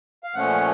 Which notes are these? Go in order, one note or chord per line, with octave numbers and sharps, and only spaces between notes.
F5
A#2 F3 A3 C#4 F#5